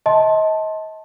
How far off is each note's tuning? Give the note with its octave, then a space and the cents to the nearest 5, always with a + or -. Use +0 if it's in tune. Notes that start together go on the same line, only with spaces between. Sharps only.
D#5 +35 A5 +0 C6 +20